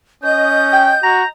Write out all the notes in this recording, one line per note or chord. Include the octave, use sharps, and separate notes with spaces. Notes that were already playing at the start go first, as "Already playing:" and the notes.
C#4 D#5 G6
G5
F#4 A#5